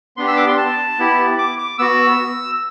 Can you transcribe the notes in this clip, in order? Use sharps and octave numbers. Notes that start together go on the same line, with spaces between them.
B3 D4 G4 C6
E6
D6
C6
A5
B3 E4 G4
D6
D6
B3 F#4 E6